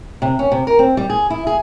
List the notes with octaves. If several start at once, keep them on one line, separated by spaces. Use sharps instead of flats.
C3
C#4
C3
A#4
C4
G3
G#4
E4
G#4